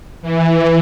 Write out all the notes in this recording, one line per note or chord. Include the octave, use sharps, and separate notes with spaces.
E3